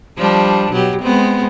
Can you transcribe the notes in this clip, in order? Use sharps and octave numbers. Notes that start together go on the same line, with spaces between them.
F3 G3 D4
B2 F#3 G4
G#3 B3 C4